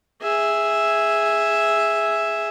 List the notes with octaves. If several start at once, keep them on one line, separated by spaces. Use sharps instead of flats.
G#4 E5